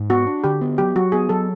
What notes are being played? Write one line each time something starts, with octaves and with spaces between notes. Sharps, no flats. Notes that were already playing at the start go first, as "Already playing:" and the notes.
Already playing: G#2
B3 F#4
D4
D3 G4
B3
F#3 G4
F#3 F#4
B3 G#4
F#3 A4